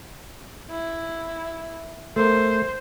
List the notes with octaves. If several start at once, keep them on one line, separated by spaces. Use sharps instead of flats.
E4
A3 A#4 C5